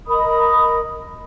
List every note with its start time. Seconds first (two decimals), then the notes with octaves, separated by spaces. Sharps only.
0.07 A#4 D#5 B5 D#6